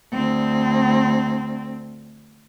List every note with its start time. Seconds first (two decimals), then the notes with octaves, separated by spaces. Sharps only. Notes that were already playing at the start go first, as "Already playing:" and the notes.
0.13 D2 C4